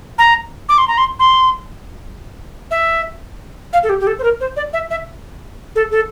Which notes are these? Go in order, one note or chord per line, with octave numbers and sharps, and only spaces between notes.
A#5
D6
C6
A#5
C6
C6
E5
F5
A4
G4
G4
A4
C5
A#4
C5
D5
E5
E5
A4
A4